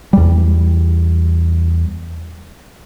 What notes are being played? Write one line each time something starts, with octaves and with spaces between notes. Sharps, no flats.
E2 G3